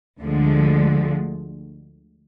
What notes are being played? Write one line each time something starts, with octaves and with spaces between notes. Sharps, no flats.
D2 D3 F3 G#3